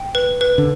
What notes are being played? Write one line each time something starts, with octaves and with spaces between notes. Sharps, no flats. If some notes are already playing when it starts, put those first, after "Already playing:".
Already playing: G5
B4
B4
D3